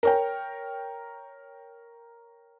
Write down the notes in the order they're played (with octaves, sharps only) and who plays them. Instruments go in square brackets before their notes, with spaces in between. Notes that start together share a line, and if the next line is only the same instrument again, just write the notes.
[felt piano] A#4 C#5 G5